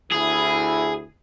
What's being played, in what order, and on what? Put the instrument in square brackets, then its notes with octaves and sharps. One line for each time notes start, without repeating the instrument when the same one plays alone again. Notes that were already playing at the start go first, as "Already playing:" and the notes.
[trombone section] D2 E4 [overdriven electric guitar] G#4